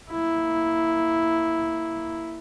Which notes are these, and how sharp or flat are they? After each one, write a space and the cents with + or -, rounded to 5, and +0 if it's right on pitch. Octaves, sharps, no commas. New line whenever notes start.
A#3 +0 E4 +0